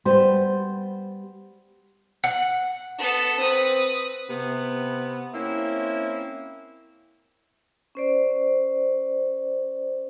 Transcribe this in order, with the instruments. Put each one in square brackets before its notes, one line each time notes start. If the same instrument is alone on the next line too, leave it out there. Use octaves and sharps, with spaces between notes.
[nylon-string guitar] G3 B3 C5
[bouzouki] F#5
[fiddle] B3 A4
[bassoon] C4 [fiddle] B4 D#6
[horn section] C3 B3
A#3 C4 C#4 E4
[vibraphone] C#4 C5 D5